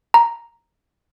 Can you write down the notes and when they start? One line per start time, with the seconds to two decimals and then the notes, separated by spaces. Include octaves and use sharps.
0.14 A#5